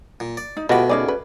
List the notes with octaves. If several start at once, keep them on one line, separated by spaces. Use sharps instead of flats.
A#2
D5
D#4
D2 B2 F4 G4 D#5 F#5 B5
C#4 D#4 G#4 D5 G#5
B4